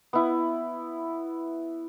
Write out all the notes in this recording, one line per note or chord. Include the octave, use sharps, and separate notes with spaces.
B3 E4